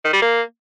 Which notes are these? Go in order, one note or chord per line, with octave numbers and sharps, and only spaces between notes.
D#3
G3
A#3